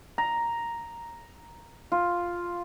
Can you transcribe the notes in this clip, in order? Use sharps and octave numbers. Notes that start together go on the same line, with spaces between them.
A#5
F4